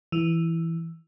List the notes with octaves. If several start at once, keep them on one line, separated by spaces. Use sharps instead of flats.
E3